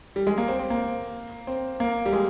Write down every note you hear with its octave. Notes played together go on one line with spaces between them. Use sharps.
G3
G#3
A#3
C4
C4
A#3
C4
A#3
G3
G#3